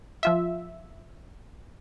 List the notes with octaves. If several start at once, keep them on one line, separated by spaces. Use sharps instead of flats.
F3 F4 E5